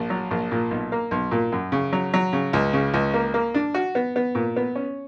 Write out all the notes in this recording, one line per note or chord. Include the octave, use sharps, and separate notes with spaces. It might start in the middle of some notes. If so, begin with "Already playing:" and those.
Already playing: A#1
F#3
A#1
A#2
B1
A#3
B1
A#2
F#2
C#3
F#3
F#3
C#3
C#2
C#3
C#2
A#3
A#3
D4
F#4
B3
B3
A#2
B3
C#4